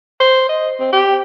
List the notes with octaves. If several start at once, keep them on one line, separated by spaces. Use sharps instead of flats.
C5
D#5
C4
G4